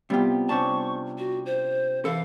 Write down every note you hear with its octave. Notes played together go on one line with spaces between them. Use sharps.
C3 G3 B3 F4 G4
C3 C#4 D4 A5 C#6
F#4
C5
E3 A4 F5